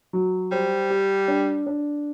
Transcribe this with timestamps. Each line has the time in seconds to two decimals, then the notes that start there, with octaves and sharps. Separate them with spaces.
0.13 F#3
0.51 G3 C5
0.90 G4
1.28 D4
1.67 D4